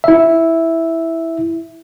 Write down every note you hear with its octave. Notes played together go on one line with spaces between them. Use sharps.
E4 E5